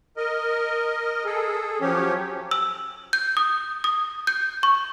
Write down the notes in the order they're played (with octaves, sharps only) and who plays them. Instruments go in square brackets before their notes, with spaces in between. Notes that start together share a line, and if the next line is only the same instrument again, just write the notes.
[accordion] A#4 D#5
G#4 A4
F3 F#3 C#4 G4 C#5
[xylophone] E6
G6
D#6
D#6
G6
C#6